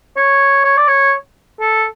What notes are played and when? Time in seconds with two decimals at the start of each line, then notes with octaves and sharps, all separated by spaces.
0.17 C#5
0.64 C#5
0.78 D5
0.88 C#5
1.60 A4